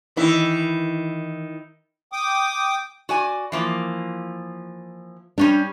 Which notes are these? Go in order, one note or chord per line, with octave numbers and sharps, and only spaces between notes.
D#3 E3 E4
G5 D6 D#6
F#4 D5 G#5
E3 F3 A#3
G3 C#4 D4 G4